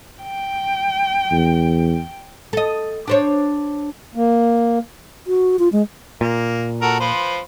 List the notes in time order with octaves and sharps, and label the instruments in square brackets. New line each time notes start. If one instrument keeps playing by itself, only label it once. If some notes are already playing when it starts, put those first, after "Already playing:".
[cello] G5
[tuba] E2
[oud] A4 D#5
D4 C5 C#5
[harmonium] A#3
[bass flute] F#4
F4
G#3
[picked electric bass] A#2 [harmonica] A#3
[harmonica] F#4 A4 A#4
F3 B4 C5